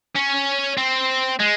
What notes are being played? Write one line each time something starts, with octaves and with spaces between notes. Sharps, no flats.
C#4
C4
G#3